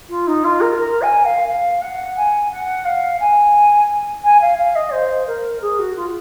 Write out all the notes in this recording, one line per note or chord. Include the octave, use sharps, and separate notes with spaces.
F4
D#4
F4
A#4
A#4
G#5
F5
F5
F#5
G#5
F#5
F5
G#5
G#5
F5
F5
D#5
C5
A#4
G#4
F#4
F4